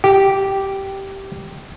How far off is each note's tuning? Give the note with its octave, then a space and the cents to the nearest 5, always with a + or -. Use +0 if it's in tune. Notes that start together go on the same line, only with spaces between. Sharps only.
G4 -10